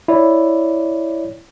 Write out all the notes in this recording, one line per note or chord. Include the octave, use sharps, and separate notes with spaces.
E4 C#5 D5